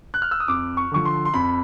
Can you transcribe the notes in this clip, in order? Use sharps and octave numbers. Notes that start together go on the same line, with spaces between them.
F#6
F6
E6
D#6
F2 D6
C#6
D3 F3 C#6
C6
C6
F2 B5